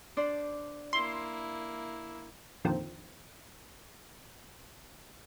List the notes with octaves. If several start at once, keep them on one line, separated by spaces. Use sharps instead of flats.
D4 C5 D5
A#3 E4 C6
F2 A#2 D3 D#3 F3 C4